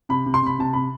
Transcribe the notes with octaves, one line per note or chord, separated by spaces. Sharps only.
C3 B5
C3
C6
C3 B5
C3 A5
C3 B5